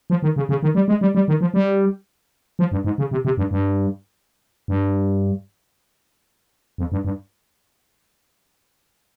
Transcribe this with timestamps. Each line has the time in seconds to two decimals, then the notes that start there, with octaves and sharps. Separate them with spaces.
0.10 F3
0.23 D#3
0.36 C#3
0.49 C#3
0.63 D#3
0.75 G3
0.88 G#3
1.01 G3
1.15 G3
1.28 D#3
1.41 F3
1.54 G3
2.59 F3
2.72 G2
2.84 G#2
2.98 C#3
3.11 C3
3.25 C3
3.37 G2
3.51 G2
4.68 G2
6.78 F2
6.92 G2
7.05 G2